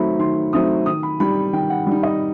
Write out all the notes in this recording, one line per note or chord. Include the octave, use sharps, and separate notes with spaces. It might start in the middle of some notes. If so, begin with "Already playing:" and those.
Already playing: D#3 F#3 A3 C4 D#4 B5
D#3 C6
F#3 A3 C4 D#4 D#6
D#3 D#6
B5
G3 D#4 B5
D#3 G5
F#5
G3 D#4
D#5